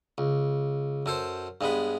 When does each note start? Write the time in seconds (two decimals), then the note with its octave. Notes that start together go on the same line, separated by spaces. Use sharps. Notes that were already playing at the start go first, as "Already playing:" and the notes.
0.18 C#2
1.06 F#2 A4 C5
1.61 G2 G#3 B3 B5